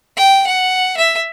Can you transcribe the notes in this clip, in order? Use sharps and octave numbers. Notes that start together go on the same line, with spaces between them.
G5
F#5
E5